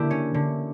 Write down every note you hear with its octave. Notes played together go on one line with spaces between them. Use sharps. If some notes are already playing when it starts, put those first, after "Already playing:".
Already playing: D3 A#3 E4 G4 E5
C#4
D3